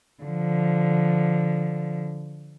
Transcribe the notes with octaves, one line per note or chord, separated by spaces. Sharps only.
D3 F3